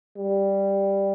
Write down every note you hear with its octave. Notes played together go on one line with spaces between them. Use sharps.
G3